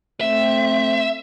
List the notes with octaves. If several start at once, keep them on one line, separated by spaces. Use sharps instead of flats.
A3 C4 E5